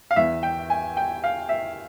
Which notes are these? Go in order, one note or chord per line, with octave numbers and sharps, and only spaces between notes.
F5
E2 E3 E5
G5
G#5
G5
F5
E5